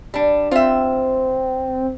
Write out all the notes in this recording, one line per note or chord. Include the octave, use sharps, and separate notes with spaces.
G3 D4
C4 F4 E5